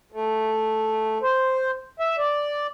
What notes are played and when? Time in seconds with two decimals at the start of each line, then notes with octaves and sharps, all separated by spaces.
0.12 A3
1.22 C5
2.00 E5
2.18 D5